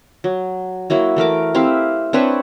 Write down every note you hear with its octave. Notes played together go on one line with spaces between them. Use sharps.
F#3
F#3 A#3 E4 F#4
E3 A3 A#4 D6
C4 E4 G4 F5
C4 D4 B4 C#5